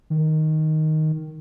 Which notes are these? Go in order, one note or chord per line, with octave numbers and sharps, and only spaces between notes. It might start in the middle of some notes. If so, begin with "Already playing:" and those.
D#3